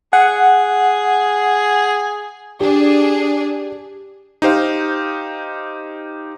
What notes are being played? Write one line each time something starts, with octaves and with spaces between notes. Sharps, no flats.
G#4 F#5
D4 G4 G#4
D#4 G4 C5 F5